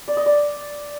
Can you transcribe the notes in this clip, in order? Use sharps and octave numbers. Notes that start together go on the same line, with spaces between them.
D5
D#5
D5